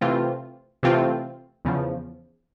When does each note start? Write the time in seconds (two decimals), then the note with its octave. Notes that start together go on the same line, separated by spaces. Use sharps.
0.01 C3 E3 A3 C4 F4
0.83 C3 E3 A3 C4 F4
1.65 E2 C#3 F3